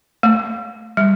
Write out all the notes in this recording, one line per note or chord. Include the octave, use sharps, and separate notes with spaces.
A3
G3